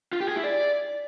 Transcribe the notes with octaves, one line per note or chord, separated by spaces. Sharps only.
F4
G4
G#4
E4
D5